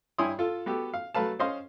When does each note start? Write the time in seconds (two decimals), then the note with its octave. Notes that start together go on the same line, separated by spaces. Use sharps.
0.18 G2 E4 C#5 G#5 C6 D#6
0.39 F4 A4
0.66 B3 F#4 G4 A4
0.94 F5
1.15 F#3 A3 B4 F5 A5
1.39 C#4 C5 D#5 F5 C6